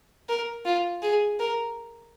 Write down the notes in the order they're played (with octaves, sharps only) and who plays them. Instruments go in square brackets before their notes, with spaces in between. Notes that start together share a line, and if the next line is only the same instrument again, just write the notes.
[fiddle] A#4
F4
G#4
A#4